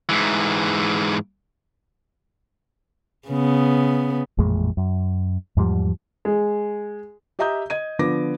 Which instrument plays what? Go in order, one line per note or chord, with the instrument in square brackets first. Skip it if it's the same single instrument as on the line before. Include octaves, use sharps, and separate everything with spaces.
[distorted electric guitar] G#2 E3
[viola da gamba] C#3 B3
[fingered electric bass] A1 F2 A#2 G#3
F#2
E2 G#2 F3 G3
[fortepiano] G#3
[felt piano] G4 D#5 E5 A#5 D#6 G6
D#5 G#6 D#7
D3 F3 B3 D6 A#6